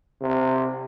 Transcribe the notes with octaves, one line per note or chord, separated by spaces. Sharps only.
C3